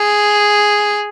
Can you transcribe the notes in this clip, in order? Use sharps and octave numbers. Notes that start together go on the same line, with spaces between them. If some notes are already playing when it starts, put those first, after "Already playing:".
Already playing: G#4